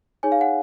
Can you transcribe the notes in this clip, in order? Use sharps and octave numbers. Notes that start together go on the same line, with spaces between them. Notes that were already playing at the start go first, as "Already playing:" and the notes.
D#4 G#4 C#5 G#5
F5
F#5